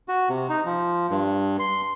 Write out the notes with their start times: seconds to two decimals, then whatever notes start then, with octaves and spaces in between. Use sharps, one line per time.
0.08 F#4
0.29 C3
0.49 D#4
0.65 F3
1.10 G2
1.60 C6